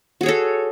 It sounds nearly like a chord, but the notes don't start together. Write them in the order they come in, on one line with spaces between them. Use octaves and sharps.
F#4 G#4 C#5 A4